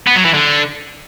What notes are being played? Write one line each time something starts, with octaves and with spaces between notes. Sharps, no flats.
B3
F#3
E3
D3